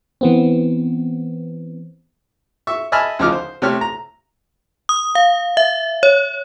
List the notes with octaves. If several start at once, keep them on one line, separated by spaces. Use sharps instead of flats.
E3 B3 C4
E5 C#6
D#5 E5 G#5 A5 B5 F6
D2 C#3 F3 D#4 D6 F6
C5
C3 A3 G4 C#5 F6
A#5
D#6
F5
E5
C#5